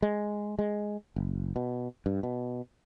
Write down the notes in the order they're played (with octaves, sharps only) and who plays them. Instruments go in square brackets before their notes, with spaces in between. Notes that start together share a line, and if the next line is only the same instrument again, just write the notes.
[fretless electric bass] G#3
G#3
F#1
B2
G2
B2